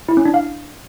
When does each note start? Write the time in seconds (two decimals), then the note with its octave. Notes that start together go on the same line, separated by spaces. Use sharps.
0.09 E4
0.17 C#4
0.25 D4
0.34 F5